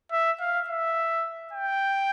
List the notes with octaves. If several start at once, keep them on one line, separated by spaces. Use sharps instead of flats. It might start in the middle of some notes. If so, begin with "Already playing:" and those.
E5
F5
E5
G5